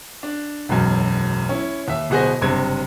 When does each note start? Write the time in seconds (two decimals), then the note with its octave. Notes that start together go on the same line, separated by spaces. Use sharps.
0.23 D4
0.69 E1 B1 F#2
1.49 C#4 E4
1.88 D#2 E5
2.10 D1 B2 F#4 G#4 C5 A#6
2.41 F#1 G2 C3 G#6